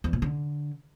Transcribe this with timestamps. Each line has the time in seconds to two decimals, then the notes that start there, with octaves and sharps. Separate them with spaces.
0.04 E2
0.13 A#2
0.22 D3